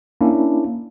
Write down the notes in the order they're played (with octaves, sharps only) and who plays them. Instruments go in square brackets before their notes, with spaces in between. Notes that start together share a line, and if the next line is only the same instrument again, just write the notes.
[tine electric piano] A#3 C#4 D4 E4